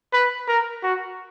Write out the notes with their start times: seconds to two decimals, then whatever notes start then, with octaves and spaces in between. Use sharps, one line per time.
0.13 B4
0.48 A#4
0.83 F#4